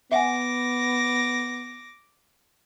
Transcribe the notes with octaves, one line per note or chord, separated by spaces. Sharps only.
B3 E5 F#5 G#5 D6 A#6